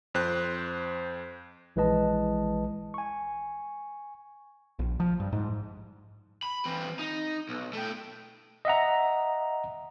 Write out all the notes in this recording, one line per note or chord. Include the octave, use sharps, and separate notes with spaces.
F2 C5 F#6
A#1 E3 G#3 B4 D#5 A5
G#5 C#6
A#1
F3
G2
G#2
B5
E3 C4
D#4
B1
A3 G5
D#5 E5 F#5 A#5